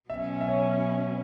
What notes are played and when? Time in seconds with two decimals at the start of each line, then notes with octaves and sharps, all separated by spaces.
0.09 B2 F#3 C#4 E5
0.41 E5
0.48 C#5